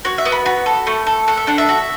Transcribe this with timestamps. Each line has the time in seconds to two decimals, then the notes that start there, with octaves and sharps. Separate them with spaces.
0.05 F#4 C#5
0.18 E5
0.25 B3
0.32 B5
0.45 F#4 B5
0.66 A4
0.87 A3
1.07 A4
1.28 A4 F#5
1.37 E5
1.47 D4 F#5
1.58 E5
1.69 F#4